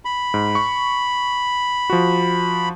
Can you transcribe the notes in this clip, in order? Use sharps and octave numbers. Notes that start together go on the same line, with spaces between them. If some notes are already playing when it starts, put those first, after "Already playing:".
B5
G#2
C#6
F3 F#4